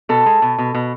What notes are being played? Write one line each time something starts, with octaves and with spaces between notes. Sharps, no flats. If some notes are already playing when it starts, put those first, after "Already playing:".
B2 A4
G#3
B2
B2
B2